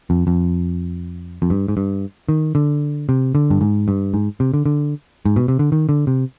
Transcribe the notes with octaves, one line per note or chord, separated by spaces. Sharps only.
F2
F2
F2
G2
G#2
G2
D#3
D3
C3
D3
G2
G#2
G2
G#2
C3
D3
D3
G#2
B2
C3
D3
D#3
D3
C3